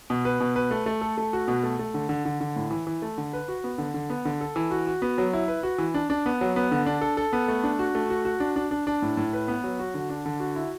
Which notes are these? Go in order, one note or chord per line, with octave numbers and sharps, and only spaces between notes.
B2
B4
B2
B4
A3
A3
A4
A3
F#4
B2
A3
A3
D3
D3
D3
D3
A2
E3
E3
A3
D3
B4
F#4
B3
D3
D3
B3
D3
A4
E3
F#4
F#4
B3
F#3
E4
B4
F#4
E3
D4
D4
B3
F#3
B3
D3
D4
A4
A4
B3
A3
D4
F#4
A3
F#4
F#4
D4
D4
D4
D4
A2
A2
B4
B3
F#3
F#4
D3
D4
D3
F#4
E4